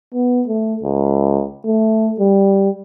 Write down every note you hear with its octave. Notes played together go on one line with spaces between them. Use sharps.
B3
A3
C#2
A3
G3